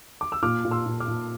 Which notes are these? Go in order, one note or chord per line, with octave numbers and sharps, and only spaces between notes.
D6
E6
A#2 D6 F6
A#2
C6 E6
A#2
D6 F6
A#2